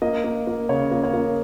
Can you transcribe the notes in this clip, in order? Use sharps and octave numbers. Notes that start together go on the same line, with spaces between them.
A#3 D#5
A#3
A#3
C#3 C#5
A#3
C#5
A#3